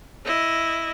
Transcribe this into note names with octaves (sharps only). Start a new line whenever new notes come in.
E4 D#5